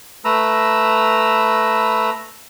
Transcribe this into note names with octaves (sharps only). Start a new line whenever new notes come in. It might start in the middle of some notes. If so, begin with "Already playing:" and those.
A3 B4 A#5 E6